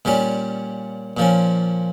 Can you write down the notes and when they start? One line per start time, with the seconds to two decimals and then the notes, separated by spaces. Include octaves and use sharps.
0.05 A#2 G3 C#4 G4
1.17 A#2 F3 A#3 C#4